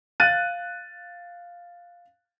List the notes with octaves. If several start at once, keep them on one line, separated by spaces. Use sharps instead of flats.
F5 F#6 A6 D#7